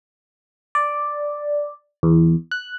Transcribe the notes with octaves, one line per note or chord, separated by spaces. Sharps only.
D5
E2
F#6